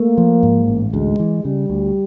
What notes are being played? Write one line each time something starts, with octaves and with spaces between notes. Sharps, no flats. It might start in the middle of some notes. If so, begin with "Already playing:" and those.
Already playing: A3 A#3
F3
G#2
A1
D2 G#3
E3
C#3 G3
D2